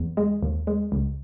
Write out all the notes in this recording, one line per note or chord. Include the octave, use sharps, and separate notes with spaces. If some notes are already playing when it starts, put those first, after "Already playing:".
Already playing: E2
G#3
D#2
G#3
C#2